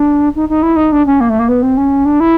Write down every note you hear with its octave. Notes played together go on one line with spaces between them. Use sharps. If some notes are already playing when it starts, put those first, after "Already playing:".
Already playing: D4
D#4
D#4
E4
D#4
D4
C#4
A#3
A3
A#3
B3
C4
C#4
D4
E4